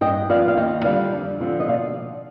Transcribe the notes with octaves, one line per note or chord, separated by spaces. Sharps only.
G2 D#5 G5
F3 B3 F4 D5 F5
F5
D#2 D#5 G5
D3 G3 D4 F4 D5 F5
F2
D3 F3 C4 F4
D#5
B2 D5 F5